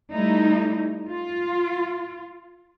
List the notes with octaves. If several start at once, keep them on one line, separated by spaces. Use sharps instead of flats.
G3 A3 D#4 E4
F4